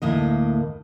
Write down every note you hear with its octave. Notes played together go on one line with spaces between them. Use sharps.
D2 A2 A#3 D#5